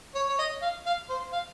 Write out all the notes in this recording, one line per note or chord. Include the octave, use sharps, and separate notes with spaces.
C#5
C#5
D#5
F5
F5
C5
F5